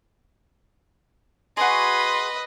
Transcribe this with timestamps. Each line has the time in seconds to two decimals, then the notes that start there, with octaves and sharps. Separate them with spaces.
1.57 F#4 G#4 B4 D#5 C6